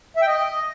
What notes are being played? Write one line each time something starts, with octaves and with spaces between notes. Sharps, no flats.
E5
G5
D#5